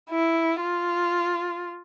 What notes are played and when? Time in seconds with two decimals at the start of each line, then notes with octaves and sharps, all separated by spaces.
0.10 E4
0.61 F4